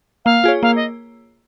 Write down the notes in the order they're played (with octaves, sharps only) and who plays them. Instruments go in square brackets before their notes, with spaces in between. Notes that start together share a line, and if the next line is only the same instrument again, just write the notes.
[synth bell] A#3 [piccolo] F5
[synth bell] F4 G#4 C#5
[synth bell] A#3 [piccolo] F5
[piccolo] D#5